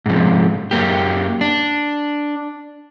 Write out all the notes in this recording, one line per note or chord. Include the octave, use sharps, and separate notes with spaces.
G#2 C3 F3
F#2 A#3 G4
D4